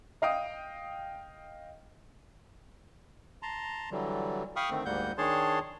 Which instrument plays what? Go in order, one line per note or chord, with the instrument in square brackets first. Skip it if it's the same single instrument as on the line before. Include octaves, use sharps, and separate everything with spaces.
[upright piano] D#5 F5 G5 D#6
[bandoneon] A5 A#5 C6
D3 E3 F#3 G3
F5 G5 B5 C#6 D#6 F6
D3 D#3 A3 C4
D2 G#2 G3 A#3 F#5 G6
D#3 D4 G#4 C#5 A5 C6